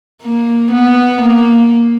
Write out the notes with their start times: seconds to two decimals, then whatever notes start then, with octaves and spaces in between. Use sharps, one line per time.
0.23 A#3
0.72 B3
1.22 A#3